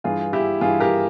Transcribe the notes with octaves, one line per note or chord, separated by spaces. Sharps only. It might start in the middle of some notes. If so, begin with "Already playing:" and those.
G2 E3 F4 G#4
E4 G4
G2 E3 F4 G#4
G4 A#4